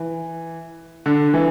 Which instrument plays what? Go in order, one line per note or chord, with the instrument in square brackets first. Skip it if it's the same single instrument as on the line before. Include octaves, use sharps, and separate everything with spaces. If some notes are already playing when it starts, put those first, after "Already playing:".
Already playing: [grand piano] E3
D3
E3